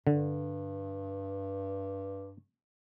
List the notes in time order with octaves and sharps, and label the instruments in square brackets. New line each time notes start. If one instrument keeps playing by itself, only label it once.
[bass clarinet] G2 [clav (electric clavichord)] D3